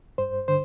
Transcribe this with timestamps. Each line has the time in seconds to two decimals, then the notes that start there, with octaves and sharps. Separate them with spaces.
0.18 G2 C5
0.48 D3 C5